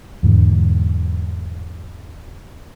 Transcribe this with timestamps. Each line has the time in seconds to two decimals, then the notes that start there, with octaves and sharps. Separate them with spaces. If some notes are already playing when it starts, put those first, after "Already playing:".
0.23 E2 G#2 D3